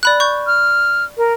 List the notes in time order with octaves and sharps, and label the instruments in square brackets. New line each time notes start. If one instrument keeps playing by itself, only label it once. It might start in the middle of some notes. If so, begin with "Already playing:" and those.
[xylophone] D5 B5 F#6
C#6 G6
[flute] F6
A#4